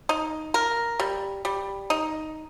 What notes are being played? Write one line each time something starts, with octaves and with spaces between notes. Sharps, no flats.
D#4
A#4
G3
G3
D#4